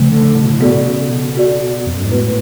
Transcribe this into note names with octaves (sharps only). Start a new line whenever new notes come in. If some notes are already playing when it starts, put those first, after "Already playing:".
Already playing: C#3 F3 A3
D3
A2
B2
A2
B2 B3 F#4 A4 D5
C#3
B2
B3 F#4 A4 D5
F2
F#2
G#2
A2 G#3 B3 F#4 B4